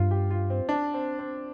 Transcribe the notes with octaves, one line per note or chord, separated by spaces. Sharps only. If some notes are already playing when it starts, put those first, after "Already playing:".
Already playing: G2 F4
G4
F4
C4
D4
C4
C4